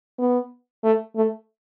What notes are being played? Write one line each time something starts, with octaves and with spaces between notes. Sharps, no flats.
B3
A3
A3